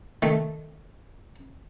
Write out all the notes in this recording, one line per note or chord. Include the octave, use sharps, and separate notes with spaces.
D#3 A3